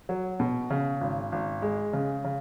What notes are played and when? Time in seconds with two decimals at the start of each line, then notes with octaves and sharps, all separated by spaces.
0.09 F#3
0.40 B2
0.70 C#3
1.01 G#1
1.32 G#1
1.62 G#3
1.93 C#3
2.25 C#3